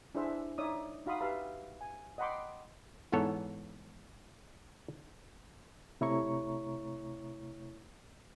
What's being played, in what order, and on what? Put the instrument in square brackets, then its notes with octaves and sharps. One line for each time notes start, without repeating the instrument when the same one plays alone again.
[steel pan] D4 E4 G#4 C5 E5
D#4 C#5 D5 E5 D#6
D#4 F#4 F5 B5 C6 D#6
G4 B4 E5 F5 A5 B5
G#5
D#5 F#5 G5 B5 C6 D6
[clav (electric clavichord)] E2 G#2 E3 B3 A4 C#5
[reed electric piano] C3 A3 E4 C#5 A#5 C#6